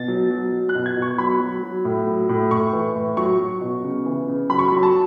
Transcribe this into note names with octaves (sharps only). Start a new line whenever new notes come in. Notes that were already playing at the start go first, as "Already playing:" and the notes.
Already playing: B2 A6
F#3
F#3
F#3
F#6
B2
G#6
B2
C#6
F#3 B5
F#3
F#3
A2
F#3
A2
A2 C#6
E3
A2
F#3 C#6
F#3
B2
C#3
E3
C#3
F#3 B5
C#6
F#3 B5
A5